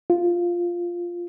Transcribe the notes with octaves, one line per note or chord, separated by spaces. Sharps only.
F4